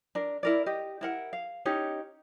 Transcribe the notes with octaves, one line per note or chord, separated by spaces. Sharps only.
D4 A#4
E4 A#4 D5
G4 D#5
E4 A#4 F#5
F5
C#4 D#4 G4 C#5